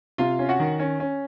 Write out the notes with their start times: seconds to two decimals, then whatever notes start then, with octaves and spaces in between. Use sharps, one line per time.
0.18 C3 F4 F5
0.39 C#4
0.49 F#4 F#5
0.60 D#3
0.79 C#4
1.00 C#4